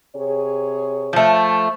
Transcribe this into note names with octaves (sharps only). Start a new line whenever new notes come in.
C3 G#4 C#5
F3 A3